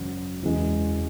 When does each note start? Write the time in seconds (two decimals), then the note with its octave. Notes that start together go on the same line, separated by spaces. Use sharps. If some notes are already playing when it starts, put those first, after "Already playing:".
Already playing: G#1 F#2 C#3 F#3
0.43 E1 E2 C#3 E3 G#3